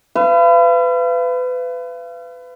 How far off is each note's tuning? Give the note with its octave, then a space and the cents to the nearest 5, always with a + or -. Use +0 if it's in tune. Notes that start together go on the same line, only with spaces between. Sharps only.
B4 +30 F5 -40